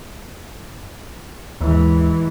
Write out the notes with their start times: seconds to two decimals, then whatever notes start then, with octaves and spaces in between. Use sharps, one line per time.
1.61 D#2 G#2 E3